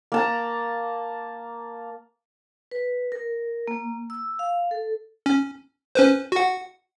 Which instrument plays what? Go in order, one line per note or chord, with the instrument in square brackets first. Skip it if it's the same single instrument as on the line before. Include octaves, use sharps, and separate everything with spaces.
[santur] A#3 A5 A#5
[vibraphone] B4
A#4
A#3
E6
F5
A4
[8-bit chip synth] C#4
C#4 B4 C5
F#4 F#5